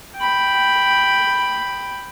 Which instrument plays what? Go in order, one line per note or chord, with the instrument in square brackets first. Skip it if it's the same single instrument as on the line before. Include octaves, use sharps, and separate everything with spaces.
[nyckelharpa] G5 B5